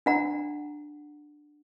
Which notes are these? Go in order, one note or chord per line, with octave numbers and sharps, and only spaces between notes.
D4 F#5 A#5